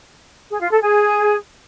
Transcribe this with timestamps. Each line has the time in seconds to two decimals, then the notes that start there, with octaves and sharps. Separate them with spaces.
0.50 G#4
0.61 F4
0.71 A4
0.81 G#4